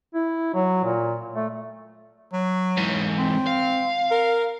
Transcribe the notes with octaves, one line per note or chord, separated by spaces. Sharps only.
E4
F#3
A#2
A3
F#3
G#2 E3
C4
F5
A#4